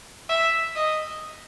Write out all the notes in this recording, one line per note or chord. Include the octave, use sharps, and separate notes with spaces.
E5
D#5